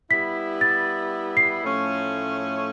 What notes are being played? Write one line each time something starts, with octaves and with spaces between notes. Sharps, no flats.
G3 B3 E4 B6
A6
C7
A2 F3 A3 C#4